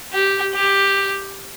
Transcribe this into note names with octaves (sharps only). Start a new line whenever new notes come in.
G4
G4